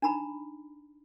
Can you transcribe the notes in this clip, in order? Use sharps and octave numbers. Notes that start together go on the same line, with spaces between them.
D4 D#4 A#5 B5